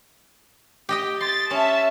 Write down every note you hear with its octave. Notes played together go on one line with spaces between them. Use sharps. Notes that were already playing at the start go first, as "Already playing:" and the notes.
G4 D#5 G5
C6 A6
C#4 E5 A5